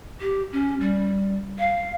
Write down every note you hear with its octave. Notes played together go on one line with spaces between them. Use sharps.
G4
C#4
G3
F5